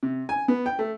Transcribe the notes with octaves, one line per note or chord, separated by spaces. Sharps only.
C3
G#5
B3
G5
A3